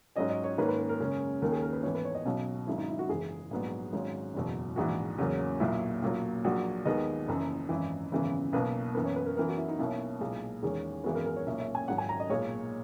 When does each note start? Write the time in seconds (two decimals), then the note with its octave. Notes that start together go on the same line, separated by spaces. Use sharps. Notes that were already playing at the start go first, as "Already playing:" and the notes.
0.16 G#2 F#3 C#4 D#5
0.30 D#5
0.44 C#5
0.58 G#2 D#3 A#3 C#4 B4
0.69 B4
0.79 B4
0.89 A#4
1.00 F#2 C#3 G#3 C#4
1.42 D#2 D#3 A#3 C#4 A#4
1.52 G#4
1.62 A#4
1.73 B4
1.83 G#2 E3 B3 C#5
1.95 B4
2.05 C#5
2.15 D#5
2.25 B1 B2 F#3 C#4
2.67 G#1 G#2 F#3 E4
2.78 D#4
2.89 E4
2.99 F#4
3.09 F#1 F#2 E3 G#3 G#4
3.51 A#1 G#2 F#3 B3
3.93 G#1 G#2 F#3 C#4
4.34 F#1 E2 B2 F#3
4.76 A#1 G#2 E3 F#4
5.18 E2 C#3 F#3 A#3 C#4
5.60 B1 A#2 F#3 E4
6.02 B1 A#2 F#3
6.44 A#1 A#2 F#3 F#4
6.85 D#2 D#3 G#3 B3 D#5
7.28 F#1 F#2 E3
7.69 G#1 F#2 E3
8.12 G#1 F#2 C#3 E3 B3
8.53 B1 B2 A#3 B4
8.95 F#2 E3 B3 A#4
9.05 C#5
9.16 B4
9.26 A#4
9.37 F#2 E3 B3 A#4
9.48 F#4
9.58 E4
9.68 D#4
9.79 B1 B2 A#3 C#4 E4
10.21 B1 A#2 G#3
10.63 E2 D#3 G#3 C#4
11.04 G#1 F#2 E3 G#3 B3 F#4
11.15 A#4
11.26 A#4
11.36 C#5
11.46 B1 A#2 A#3 C#4 E5
11.60 E5
11.75 G#5
11.88 G#1 G#2 F#3 C#4 F#5
11.98 G#5
12.09 A#5
12.20 D#5
12.30 B1 A#2 G#3 C#5